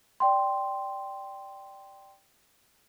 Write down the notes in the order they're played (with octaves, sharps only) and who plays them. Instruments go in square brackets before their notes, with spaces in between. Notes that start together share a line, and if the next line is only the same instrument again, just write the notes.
[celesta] D5 G5 C6